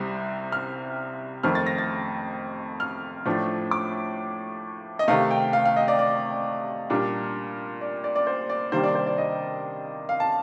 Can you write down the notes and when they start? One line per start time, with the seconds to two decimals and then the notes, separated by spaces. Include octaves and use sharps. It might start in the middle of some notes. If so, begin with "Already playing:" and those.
Already playing: C2 C3 G3 C4
0.52 F6
1.43 F2 D#3 A3 C4 F6
1.55 A6
1.67 A#6
1.78 A6
2.80 F6
3.26 A2 F3 A3 D4
3.71 D6
4.99 D#5
5.08 C3 D#3 A3 F5
5.31 G5
5.53 F5
5.65 F5
5.76 D#5
5.88 D5
5.99 D5
6.90 A#2 G3 D4
7.81 D5
8.04 D5
8.16 D5
8.27 C5
8.50 D5
8.72 C3 D#3 G3 A#3 D4 C5
8.84 D5
8.95 C5
9.06 D5
9.18 D#5
10.09 F5
10.20 A5